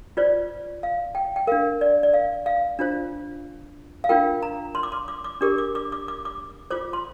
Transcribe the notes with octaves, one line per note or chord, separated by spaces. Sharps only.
F4 C5 D5
F5
G5
G5
D4 A#4 F5
D5
D5
F5
F5
D4 F4 C5
F5
D4 F4 A#4 G5
A#5
C6
D6
C6
D6
D6
D4 G4 A#4 D6
D6
D6
D6
D6
D6
F4 C5 D6
C6